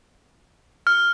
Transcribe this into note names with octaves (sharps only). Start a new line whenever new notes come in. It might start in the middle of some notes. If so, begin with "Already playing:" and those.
F6